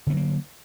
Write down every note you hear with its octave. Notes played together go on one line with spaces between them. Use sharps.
D3 F#3 A#3 B3